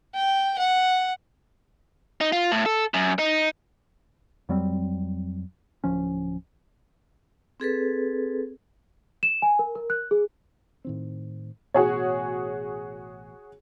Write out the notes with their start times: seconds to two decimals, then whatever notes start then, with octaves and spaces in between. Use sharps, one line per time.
0.15 G5
0.59 F#5
2.21 D#4
2.32 F4
2.52 A2
2.66 A4
2.94 F#2
3.19 D#4
4.49 F2 F#3 G3 C4
5.84 D1 F3 C#4
7.60 C4 G#4 A4 B4
9.23 E7
9.42 G#5
9.59 A#4
9.75 A#4
9.90 F#6
10.11 G#4
10.85 A2 D#3 C4
11.74 A1 B2 F#4 G#4 C#5